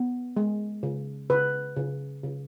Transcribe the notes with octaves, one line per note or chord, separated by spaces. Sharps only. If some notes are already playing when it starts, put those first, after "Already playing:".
Already playing: B3
G#3
C#3
C#3 B4
C#3
C#3